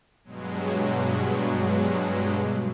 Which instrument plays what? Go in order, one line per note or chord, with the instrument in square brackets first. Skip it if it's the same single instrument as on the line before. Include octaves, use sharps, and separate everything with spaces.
[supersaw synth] G2 B2 F#3 G#3